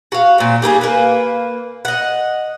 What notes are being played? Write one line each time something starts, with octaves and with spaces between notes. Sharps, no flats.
F#4 F5
A#2 C4
G3 A#3 D#4 G#4
A#3 B4
D#5 F#5